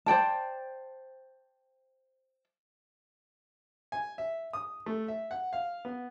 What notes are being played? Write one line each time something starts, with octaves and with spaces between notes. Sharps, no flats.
C5 D5 G5 A5
G#5
E5
D#6
A3
E5
F#5
F5
B3